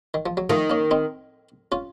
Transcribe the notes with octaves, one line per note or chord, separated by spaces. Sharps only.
D#3
F3
F#3
D#3 F3 A3
A#3 C#4
C4 D#4
C#4 F4